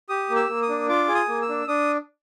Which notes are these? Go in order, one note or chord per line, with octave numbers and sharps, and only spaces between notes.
G4 D#6
A#3
E6
A#3
D#6
D4
F4 D6
G#4
D#6
A#3
E6
D4
D4 D#6